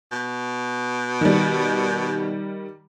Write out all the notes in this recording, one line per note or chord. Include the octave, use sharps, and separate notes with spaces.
B2
D#3 G3